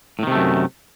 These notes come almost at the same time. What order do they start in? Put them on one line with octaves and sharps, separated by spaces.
A2 D#3 C3 A3 F#2